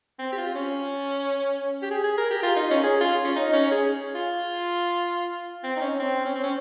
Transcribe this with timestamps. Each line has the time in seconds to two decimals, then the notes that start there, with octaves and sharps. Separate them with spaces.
0.19 C4
0.33 G4
0.38 F4
0.55 C#4
1.82 G4
1.91 G#4
2.04 G#4
2.18 A#4
2.31 G4
2.43 F4
2.56 D#4
2.70 C#4
2.83 G#4
3.01 F4
3.24 C#4
3.36 D#4
3.53 C#4
3.71 G#4
4.15 F4
5.64 C4
5.76 D#4
5.81 C#4
6.00 C4
6.25 C#4
6.35 C4
6.44 C#4